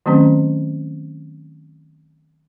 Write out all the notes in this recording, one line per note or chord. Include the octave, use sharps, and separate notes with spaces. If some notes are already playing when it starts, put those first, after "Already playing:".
D#3 F#3 A3 C4 C#4